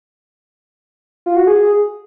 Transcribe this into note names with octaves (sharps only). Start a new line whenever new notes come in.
F4
F#4
G#4